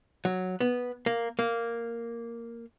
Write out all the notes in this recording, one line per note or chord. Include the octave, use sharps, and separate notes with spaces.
F#3
B3
A#3
A#3